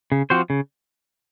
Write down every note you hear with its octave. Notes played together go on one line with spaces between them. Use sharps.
C#3
F3 C4 F#4 C5
C#3